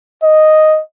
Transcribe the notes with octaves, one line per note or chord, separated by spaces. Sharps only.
D#5